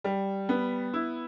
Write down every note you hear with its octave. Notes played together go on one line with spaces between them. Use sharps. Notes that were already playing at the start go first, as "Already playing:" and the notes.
G3
B3
E4